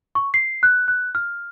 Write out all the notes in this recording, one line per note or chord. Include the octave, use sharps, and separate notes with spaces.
C#6
C7
F#6
F#6
F6